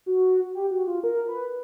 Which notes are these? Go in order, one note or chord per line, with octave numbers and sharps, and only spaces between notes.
F#4
G4
F#4
F4
A#4
B4